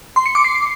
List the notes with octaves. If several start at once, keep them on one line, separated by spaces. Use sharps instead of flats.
C6
C#7
D6
C7